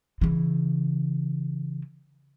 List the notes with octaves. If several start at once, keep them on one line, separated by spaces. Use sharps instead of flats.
C#3 E3